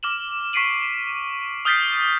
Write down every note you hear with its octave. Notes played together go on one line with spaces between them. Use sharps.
D6 F6 E7 F#7
C#6 B6 C7 D7 D#7 F#7
D#6 F6 G6 A6 B6 C7